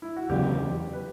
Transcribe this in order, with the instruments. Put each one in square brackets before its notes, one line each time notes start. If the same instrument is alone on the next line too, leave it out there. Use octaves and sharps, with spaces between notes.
[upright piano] E4
F#4
[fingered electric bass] E2 C#3 F#3 [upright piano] G4
[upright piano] B4